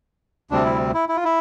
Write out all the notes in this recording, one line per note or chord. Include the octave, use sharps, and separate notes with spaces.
D2 C3 G3 C4 D4
E4
E4
E4
F4
E4